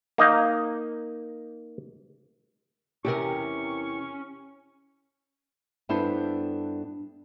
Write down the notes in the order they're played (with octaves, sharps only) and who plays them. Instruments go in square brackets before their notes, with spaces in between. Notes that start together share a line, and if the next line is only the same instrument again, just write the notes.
[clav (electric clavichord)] A#3 D#4 D#5
[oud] E2 C3 A#4 [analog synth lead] C#4 [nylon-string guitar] G4 [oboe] C#6
[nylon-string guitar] G2 B3 D4 E4 A4 C5